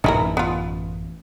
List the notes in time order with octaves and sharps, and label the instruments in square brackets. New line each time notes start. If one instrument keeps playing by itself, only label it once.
[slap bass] A1 F#2 B2 [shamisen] D#4 E4 A#4
[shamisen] B3 F4